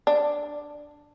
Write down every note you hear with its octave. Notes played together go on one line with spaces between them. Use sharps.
D4